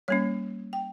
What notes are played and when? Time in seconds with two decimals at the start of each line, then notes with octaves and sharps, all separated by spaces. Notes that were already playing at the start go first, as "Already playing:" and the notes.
0.08 G3 A#3 C#4 C#5
0.73 G5